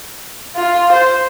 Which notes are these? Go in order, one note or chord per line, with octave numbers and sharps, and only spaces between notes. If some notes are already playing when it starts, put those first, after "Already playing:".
F4
C5